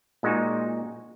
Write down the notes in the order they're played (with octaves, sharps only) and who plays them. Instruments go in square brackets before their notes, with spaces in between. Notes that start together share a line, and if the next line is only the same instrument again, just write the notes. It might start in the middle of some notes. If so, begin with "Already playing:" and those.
[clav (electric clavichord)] A#2 G#3 D#4 F#4